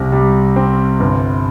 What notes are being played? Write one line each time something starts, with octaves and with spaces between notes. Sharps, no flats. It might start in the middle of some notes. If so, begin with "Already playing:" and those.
Already playing: C2 C3
G3
C4
G1